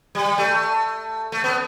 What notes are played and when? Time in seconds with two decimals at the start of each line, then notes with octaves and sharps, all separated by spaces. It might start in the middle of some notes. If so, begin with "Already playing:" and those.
0.15 G3
0.38 A3
1.32 A3
1.44 B3